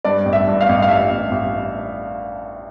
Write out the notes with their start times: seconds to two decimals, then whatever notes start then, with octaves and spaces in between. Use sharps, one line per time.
0.05 G2 D5
0.25 A1
0.33 E5
0.47 G2
0.61 F5
0.69 A1
0.82 F5
0.89 G2 E5
1.11 A1
1.31 A1